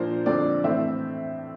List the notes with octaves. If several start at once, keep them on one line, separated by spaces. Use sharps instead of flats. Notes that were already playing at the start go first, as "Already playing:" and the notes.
Already playing: A#2 F3 A#3 D4 C5
F2 D3 F3 C4 D5
A2 E3 A3 C4 E5